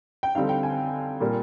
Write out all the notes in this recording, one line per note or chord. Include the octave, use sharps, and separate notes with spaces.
G5
D3 G3 C4 D#4 F5
G5
G#5
A#2 G3 A#3